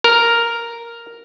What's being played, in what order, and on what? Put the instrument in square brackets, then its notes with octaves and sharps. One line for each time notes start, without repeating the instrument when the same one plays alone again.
[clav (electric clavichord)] A#4